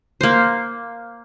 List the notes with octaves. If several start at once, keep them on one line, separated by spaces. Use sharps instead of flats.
A#3 C5